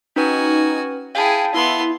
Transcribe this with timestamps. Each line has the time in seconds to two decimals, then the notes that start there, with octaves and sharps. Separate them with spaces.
0.16 C#4 D#4 F#4 B4 G#5
1.15 E4 G#4 F5 G5 A5
1.54 B3 E4 C6